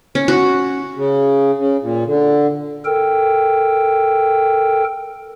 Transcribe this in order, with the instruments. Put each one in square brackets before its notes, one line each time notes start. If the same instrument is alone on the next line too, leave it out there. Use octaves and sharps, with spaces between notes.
[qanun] C#4
F#4
[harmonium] C#3
C#3
A#2
D3
[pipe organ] A4 A#4 G5